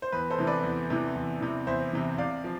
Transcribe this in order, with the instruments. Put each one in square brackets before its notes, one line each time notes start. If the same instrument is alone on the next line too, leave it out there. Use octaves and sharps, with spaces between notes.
[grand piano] C5
E2 B4
A4 C5
C3 E3
B4 D5
E2
C3 E3
E2
C3 E3
E2 C5 E5
C3 E3
C3 D5 F5
F3